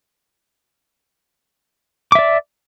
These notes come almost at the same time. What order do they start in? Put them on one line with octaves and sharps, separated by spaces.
D6 E5 D5